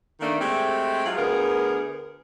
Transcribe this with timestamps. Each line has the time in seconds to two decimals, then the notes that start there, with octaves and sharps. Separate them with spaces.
0.20 D#3 A3 A#3 D4
0.39 G#3 A3 C4 G4
1.05 F#3 G#3 F4
1.17 D2 B3 G#4 A#4